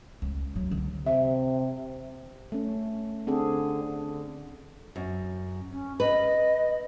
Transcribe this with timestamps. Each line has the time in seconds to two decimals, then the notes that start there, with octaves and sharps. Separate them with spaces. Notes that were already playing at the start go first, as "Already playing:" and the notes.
0.22 C#2
0.56 F#3
0.71 D3
1.07 C3 E5
2.52 A3 C#4
3.27 D3 C4 G#4 A4
3.83 D3
4.96 F#2
5.71 C#4
6.00 B4 D#5